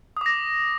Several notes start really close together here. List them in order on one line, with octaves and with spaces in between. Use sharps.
D#6 D6 A#6